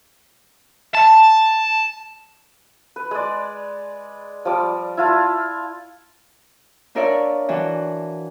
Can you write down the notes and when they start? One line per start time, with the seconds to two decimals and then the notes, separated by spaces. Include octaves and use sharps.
0.95 A5
2.96 B4
3.11 G#3 D5
4.45 F3 G3 D6
4.97 E4 F4 A5
6.95 D4 F4 A#4 C#5 D5 E5
7.49 E3 D4 F#4